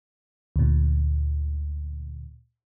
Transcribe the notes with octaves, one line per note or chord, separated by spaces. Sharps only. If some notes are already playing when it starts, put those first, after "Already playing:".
D2 A#2